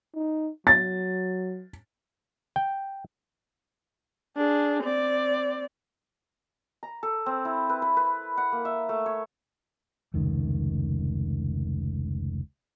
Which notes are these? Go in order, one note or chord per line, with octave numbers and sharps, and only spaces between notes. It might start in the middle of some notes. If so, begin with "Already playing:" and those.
D#4
F#3 A6
G5
D4 G#4
C4 D5
A#5
A4
C4
E4
B4
B4
B4
F#5
A#3
E5
A3
C#5
F1 C#2 D#3